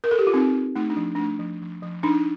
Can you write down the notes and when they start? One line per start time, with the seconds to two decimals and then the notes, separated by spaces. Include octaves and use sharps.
0.04 A#4
0.11 A4
0.19 G4
0.27 F4
0.34 C4 D#4
0.55 C4
0.76 A3 D#4
0.90 D4
0.97 F3
1.15 A3 D4
1.39 F3
1.62 F3
1.82 F3
2.03 D4 D#4